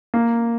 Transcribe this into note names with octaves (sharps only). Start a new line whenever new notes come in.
A#3